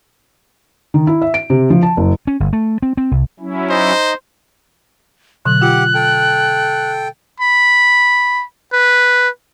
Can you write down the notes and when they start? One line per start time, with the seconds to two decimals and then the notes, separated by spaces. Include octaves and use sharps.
0.94 D#3
1.07 E4
1.22 E5
1.34 D7
1.50 C3
1.70 F3
1.83 A5
1.97 F#1
2.27 C#4
2.40 G1
2.53 A3
2.82 C4
2.97 C4
3.11 C2
3.40 F#3 C#4 E4
3.70 D#4 C5 D#5
5.45 B2 D3 F#3 F#6
5.62 F4 G4 F#5
5.94 A4 G5
7.40 B5
8.73 B4